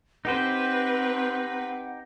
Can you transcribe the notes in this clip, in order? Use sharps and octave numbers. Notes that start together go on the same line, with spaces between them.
C4 D#4 G4 B4 C5 F#5